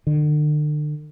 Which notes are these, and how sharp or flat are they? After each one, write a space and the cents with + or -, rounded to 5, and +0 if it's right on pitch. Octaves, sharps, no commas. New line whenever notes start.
D3 +40